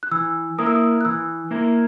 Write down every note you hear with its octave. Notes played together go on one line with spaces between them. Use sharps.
F#6
E3 E6
A#3 E4 A#4 D#6
E6
D#6
F#6
E3 E6
A#3 E4 A#4